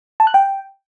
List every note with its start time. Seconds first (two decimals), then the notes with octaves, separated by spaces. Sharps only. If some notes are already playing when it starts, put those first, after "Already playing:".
0.20 A5
0.27 F#6
0.34 G5